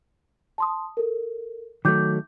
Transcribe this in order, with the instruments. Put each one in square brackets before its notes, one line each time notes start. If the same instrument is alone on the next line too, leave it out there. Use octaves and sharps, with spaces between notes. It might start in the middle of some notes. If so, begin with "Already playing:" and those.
[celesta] A5 C6 D#6
A4 A#4
[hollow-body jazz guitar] D#3 F#3 A3 [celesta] D6 G6